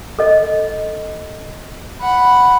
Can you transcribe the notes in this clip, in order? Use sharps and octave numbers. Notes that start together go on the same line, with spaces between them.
A4 D#5
F#5 B5